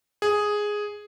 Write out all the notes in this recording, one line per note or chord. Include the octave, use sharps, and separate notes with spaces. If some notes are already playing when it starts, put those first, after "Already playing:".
G#4